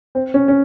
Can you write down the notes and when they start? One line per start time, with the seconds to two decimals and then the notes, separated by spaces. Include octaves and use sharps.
0.15 C4
0.34 C#4
0.48 C#4